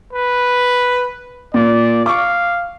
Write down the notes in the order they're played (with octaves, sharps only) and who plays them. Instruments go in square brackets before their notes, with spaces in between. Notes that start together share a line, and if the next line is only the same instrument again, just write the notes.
[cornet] B4
[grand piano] A#2 [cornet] D5
[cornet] F5 [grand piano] C#6 D6